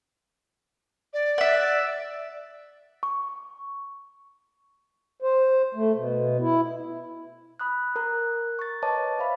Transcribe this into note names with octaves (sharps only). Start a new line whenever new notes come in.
D5
E5 F#5
C#6
C5
A3
B2
E4
B5 D#6 F#6
A#4 A#5 F#6
C#6 A6
B4 C#5 D#5 A5 D6
C5 E5 F5 B5